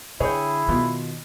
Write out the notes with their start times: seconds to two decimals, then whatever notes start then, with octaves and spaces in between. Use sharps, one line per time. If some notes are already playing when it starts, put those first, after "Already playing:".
0.20 D3 E4 G#4 C#5 G5
0.69 B2 D#3 F4